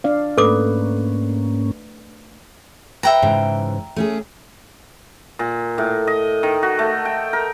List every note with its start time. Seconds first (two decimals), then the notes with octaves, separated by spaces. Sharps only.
0.04 D4 D5 F5
0.38 G#2 A3 A#3 C#4 A4 B4 D6
3.03 B4 E5 G5 A#5
3.22 G#2 C#3 E3
3.96 A3 C#4 G#4
5.39 A#2
5.78 A2
6.07 D#5
6.43 D#3
6.63 F#4
6.79 A3
7.05 G5
7.33 A#4